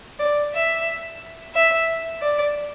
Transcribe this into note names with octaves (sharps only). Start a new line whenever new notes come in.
D5
E5
E5
D5